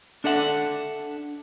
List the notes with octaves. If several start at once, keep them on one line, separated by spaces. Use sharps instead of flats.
D4 A4 E5 F#5